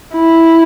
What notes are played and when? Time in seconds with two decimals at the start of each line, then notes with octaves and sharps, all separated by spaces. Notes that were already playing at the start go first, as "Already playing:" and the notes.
0.14 E4